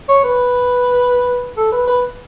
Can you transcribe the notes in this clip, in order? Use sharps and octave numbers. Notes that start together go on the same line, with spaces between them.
C#5
B4
A4
B4
B4